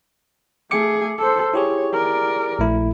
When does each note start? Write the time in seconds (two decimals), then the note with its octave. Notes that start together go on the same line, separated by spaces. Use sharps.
0.71 A3 G#4 D6 C#7
1.18 A4 C5
1.54 E4 G4 G#4 C#5
1.93 A#4 D5
2.59 A#1 A3 E4